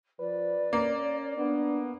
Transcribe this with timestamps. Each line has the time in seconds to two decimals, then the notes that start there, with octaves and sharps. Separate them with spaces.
0.20 F3 B4 D5
0.73 A#3 C#4
1.38 B3 D4